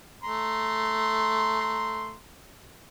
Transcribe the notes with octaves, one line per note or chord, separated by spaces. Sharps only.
A3 A#5 C6